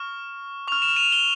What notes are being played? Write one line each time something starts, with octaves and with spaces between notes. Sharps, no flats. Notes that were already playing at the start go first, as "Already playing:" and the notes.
Already playing: C#6 F6
C#6 F6 F7
E7
D#7 F7
F7 G7